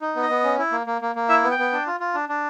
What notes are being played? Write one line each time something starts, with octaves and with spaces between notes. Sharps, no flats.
D#4
B3
D#5
B3
C#4
E4
A#3
A#3
A#3
A#3
E4 E5
B3
G5
B3
D4
F4
F4
D4
D4